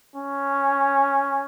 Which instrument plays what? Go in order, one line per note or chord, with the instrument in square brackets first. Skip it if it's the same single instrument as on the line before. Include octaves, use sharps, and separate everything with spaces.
[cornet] C#4